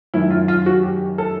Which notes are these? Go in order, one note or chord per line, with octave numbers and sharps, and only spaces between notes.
F#2 D#3 E4
F4
F4
F#4
G4
A4